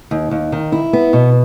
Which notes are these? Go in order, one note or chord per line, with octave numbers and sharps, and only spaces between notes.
D#2
D#2
D#3
E4
B3
B2